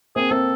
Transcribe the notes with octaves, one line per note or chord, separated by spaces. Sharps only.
A#3 C4 G#4
A#3 C4 A4